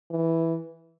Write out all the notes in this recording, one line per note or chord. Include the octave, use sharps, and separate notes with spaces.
E3